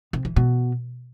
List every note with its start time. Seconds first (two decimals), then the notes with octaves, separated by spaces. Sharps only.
0.13 C3
0.25 E3
0.36 B2